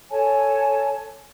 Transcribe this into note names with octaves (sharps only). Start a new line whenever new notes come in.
A4 C#5 G#5 A5